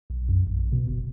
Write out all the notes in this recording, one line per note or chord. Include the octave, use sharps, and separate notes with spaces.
B1
F#2
A1
A#1
B2
F#1